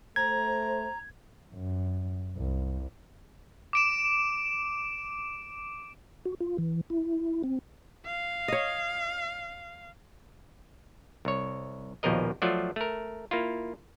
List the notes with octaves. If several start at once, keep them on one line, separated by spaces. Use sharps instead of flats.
A3 C5 A#5 G#6
F#2
C2
D6 D7 E7
F#4
F4
E3
E4
C4
F5
C#5 D#5
C2 C#5
A#1 D#2 B2 F3 A#4 D#5
F3 F#3 A3 F4 D5
A3 A#4
A#3 E4 F4